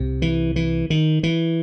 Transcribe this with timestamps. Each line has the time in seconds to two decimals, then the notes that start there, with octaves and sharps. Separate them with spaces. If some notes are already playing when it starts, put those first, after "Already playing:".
Already playing: C2 C3
0.22 E3
0.56 E3
0.90 D#3
1.23 E3